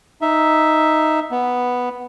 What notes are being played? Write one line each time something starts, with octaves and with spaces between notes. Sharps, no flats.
D#4 E5
B3